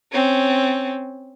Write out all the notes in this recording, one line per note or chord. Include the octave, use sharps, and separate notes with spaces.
C4 C#4